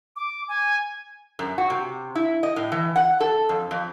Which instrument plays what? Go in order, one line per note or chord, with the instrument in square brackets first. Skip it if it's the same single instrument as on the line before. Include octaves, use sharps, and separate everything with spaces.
[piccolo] D6
G#5
[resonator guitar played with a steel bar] F#2
F#4
C3
E4
D#5
A2
E3
F#5
A4
F2
F2